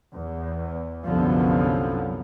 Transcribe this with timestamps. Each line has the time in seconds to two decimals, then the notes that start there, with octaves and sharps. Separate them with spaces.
0.13 E2
1.04 C2 F#2 D3 F3 F#3 B3